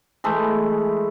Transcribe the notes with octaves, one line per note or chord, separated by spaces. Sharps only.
E3 G#3 A3